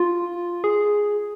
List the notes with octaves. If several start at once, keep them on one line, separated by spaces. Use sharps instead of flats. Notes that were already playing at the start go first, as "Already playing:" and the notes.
Already playing: F4
G#4